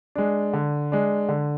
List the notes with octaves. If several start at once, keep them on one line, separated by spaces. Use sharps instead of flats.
G#3 D4
D3
G#3 D4
D3